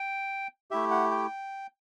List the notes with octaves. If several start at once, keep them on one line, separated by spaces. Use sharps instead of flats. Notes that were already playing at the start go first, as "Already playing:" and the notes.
Already playing: G5
A3 E4 G4 E5
F#5
G5